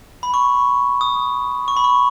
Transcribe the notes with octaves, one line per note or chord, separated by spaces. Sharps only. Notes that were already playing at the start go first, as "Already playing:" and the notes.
B5
C#6
D#6
C#6
B5
C#6